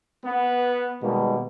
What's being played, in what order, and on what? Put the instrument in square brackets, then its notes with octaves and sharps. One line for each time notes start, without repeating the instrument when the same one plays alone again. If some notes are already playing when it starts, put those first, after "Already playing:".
[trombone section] B3
B2 D#3 G3 G#3 A#3